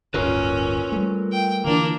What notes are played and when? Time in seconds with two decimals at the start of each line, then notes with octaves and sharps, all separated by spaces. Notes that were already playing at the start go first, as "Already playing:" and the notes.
0.14 D1 G1 C#4 F4 A#4 B4
0.92 G3 A3
1.32 G5
1.64 D3 E3 A#3 D4